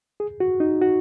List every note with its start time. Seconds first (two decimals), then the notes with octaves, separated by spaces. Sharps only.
0.20 G#4
0.40 F#4
0.60 D#4
0.81 F#4